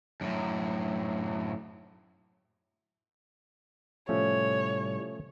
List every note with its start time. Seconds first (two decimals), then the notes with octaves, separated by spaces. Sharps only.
0.21 F#2 A2
4.09 A2 C3 F3 G3 A3 C#4 C#5